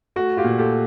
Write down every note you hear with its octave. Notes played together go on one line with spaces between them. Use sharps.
A3 F#4
F4 G4
A#2
G4 A4